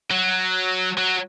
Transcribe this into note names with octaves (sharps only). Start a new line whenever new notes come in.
F#3
F#3